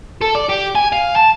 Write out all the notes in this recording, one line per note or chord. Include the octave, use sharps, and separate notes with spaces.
A4
D5
G4
G#5
F5
A5